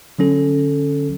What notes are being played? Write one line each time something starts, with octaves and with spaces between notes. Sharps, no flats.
D3 F#3 C#4 A4